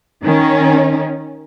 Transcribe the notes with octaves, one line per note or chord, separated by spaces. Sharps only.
D#3 C#4